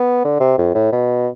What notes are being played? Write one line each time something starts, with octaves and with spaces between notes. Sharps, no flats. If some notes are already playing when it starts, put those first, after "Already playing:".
Already playing: B3
D3
C3
F2
A2
B2